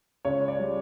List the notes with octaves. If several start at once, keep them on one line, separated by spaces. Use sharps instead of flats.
C#2 C#5
D5
G3